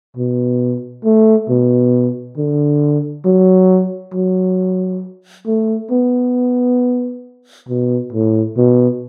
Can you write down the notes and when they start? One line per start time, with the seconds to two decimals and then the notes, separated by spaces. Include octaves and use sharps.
0.17 B2
1.05 A3
1.49 B2
2.37 D3
3.25 F#3
4.14 F#3
5.47 A3
5.91 B3
7.69 B2
8.13 A2
8.57 B2